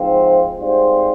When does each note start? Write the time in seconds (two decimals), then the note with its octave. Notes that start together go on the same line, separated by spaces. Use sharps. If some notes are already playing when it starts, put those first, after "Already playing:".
Already playing: G#2 F3 C4 F4 C5
0.59 G#2 G3 C4 F4 C5